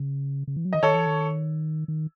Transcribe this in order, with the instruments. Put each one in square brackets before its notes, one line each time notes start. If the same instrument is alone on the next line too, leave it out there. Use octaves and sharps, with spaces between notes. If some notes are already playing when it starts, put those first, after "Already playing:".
Already playing: [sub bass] C#3
C#3
E3
F#3
[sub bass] D#3 [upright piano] D#5
[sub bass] D#3 [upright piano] A4 C#5
[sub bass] E3
D#3
D#3